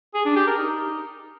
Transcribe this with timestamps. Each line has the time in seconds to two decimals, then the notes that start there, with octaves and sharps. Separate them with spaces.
0.14 G#4
0.25 D4
0.36 G4
0.47 A#4
0.58 D#4